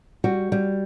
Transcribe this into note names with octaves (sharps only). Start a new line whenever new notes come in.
G3 F#4
G3